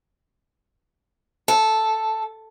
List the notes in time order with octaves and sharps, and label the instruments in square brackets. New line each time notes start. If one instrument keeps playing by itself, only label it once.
[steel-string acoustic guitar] A4